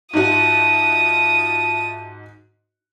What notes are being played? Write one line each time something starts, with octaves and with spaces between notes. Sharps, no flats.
G#2 D#4 F4 F#4 E5 A5 D#6